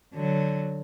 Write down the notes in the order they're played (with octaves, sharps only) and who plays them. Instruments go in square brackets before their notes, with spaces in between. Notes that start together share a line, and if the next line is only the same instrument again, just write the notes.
[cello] D3 F#3